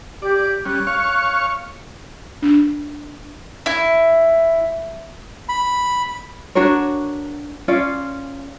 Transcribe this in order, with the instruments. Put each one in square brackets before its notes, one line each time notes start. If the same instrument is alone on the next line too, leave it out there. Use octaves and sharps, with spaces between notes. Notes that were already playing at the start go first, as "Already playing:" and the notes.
[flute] G4 [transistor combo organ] D5
[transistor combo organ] G3 C#4 [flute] F#6
[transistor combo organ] C#5 F5 C#6
[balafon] D4
[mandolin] E4
[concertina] B5
[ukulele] D4 F#4 A#4 C#5
C#4 F4 D5 F5